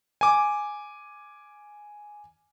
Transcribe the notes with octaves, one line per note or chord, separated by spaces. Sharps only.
G#5 D6